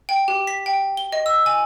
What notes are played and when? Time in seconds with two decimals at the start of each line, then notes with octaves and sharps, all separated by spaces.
0.09 G5
0.28 G4
0.47 B6
0.66 G5
0.97 G7
1.12 D#5
1.26 E6
1.46 G#5